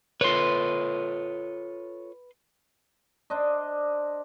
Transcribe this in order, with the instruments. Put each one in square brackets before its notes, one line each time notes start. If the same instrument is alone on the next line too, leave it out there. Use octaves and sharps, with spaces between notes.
[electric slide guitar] F4 A4 C#5 [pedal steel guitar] B4 C6
[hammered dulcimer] D4 C5 D5 D#5